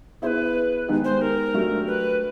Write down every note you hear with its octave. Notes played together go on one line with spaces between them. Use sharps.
B3 E4 G#4 B4 C5
D#3 G#3 B3 D#4 G4
C5
A#4
F#3 A3 D4 G4
B4